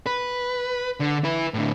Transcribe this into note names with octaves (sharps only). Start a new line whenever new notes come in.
B4
D3
E4 B4
A2 D3